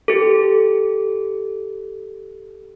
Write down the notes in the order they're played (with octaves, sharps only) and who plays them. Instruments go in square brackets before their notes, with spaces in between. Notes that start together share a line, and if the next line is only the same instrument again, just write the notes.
[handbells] G4 A4